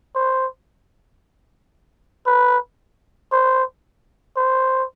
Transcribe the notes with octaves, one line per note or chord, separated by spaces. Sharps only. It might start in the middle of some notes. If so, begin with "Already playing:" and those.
C5
B4
C5
C5